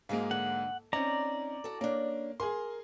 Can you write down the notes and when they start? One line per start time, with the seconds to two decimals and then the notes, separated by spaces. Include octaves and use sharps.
0.09 G#2 G#3 A#3 F#4 G#4 F5
0.31 D3 F#5
0.93 C4 C#4 D#4 D5 A#5
1.64 F#4 A4
1.81 A#3 C#4 D4
2.40 G#4 A#4 G#5 C6